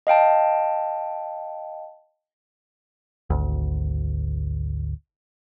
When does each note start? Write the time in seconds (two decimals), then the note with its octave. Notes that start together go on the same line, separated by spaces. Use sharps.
0.07 D#5 F5 G5 A5
3.30 G#1 D2